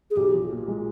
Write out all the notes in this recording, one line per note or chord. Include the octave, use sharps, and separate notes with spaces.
G#4
B1 G4
F3
A#2
G#3